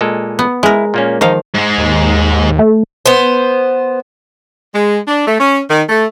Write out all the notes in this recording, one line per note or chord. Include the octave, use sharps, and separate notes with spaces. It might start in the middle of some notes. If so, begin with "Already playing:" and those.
A#2 G#3 A4
B3
G#3 E4 A#4
A#2 A#3 C#4
D#3 F3 D#4 F5
G#2 G#3
D#2
A3
B3 C5
G#3
D4
A3
C#4
D#3
A3